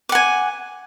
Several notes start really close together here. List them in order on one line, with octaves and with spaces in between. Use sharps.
D6 F#5 G#5